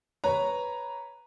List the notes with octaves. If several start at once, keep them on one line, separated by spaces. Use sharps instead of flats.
B4 C#5 A#5